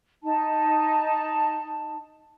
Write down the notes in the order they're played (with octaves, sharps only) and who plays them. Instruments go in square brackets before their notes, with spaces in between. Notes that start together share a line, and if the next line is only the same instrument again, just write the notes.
[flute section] D#4 A5